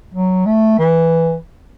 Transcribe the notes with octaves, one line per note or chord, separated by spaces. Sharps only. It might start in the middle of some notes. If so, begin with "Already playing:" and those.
F#3
A3
E3